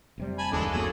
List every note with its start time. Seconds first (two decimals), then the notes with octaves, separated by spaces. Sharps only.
0.18 F1 C3 G3
0.38 G#5 A5 B5
0.51 F#1 D#2 E3 G#3 C#4 D4 A4
0.72 G1 F#2 F#3 A#3 G#4